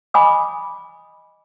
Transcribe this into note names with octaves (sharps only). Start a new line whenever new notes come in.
D#5 G#5 B5 C6 D6 D#6